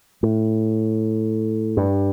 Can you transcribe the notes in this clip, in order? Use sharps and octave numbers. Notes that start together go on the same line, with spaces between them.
A2
G2